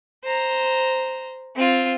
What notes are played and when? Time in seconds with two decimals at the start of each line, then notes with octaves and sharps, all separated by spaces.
0.24 C5 A#5
1.56 C4 F4